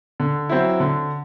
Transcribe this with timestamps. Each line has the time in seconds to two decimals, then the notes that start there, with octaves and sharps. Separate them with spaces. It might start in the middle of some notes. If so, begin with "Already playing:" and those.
0.20 D3
0.49 F#3 C4 E4
0.80 D3